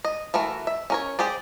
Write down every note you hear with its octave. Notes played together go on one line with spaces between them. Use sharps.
D#5
E3 A3 F#4 A#4
E5
C#4 A#4 C#5
G4 G#4 C5 D5